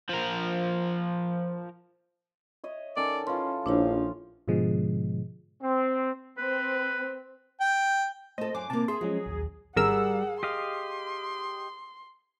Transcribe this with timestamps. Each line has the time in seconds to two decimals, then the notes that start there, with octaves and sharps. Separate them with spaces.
0.09 F3 A#4
2.64 C#5 D#5 E5
2.96 D#3 C#4 A4 D5
3.27 E3 C#4 F4 C6
3.66 A#1 F3 D4 E4 C#5
4.48 G#2 B2 D3 F3 G#3
5.61 C4
6.38 C4 B4
7.61 G5
8.38 A3 A4 C5 D#5
8.55 F#2 F5 G#5 D6
8.70 C3 A#3 A5
8.88 G#4 E5 C6
9.01 F3 F#3 G#3 C#4
9.26 A#1 D#2
9.76 G#1 G3 G#4 A#4 F#5 E6
10.43 G4 D#5 F5 C6